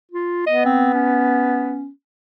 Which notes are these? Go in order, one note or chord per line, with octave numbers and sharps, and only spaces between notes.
F4
B3 D#5
C4
C#4